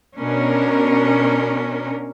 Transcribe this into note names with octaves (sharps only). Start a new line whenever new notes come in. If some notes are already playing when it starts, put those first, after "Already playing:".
B2 C#4 D4 A#4